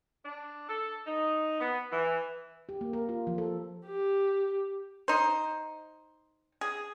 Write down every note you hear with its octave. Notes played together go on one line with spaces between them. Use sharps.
D4
A4
D#4
B3
E3
G4
A#3
A#4
F4
F3
A4
G4
D#4 C5
G#4